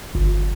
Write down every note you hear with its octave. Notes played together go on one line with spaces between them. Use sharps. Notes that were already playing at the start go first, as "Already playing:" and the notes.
G1